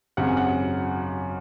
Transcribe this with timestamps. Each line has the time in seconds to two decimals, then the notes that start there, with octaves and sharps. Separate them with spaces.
0.17 G#1 F#2 C#3 F#5
0.27 G#5
0.37 F#5